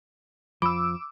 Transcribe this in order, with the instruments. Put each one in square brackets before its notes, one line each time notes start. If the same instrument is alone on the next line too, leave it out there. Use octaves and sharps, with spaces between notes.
[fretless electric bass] F2 F3 [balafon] B5 [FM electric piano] D6 E6